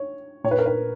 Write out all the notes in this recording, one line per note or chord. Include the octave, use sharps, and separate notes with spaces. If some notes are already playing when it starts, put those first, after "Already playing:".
Already playing: C#5
A#2 C#5
B4
A#4
B4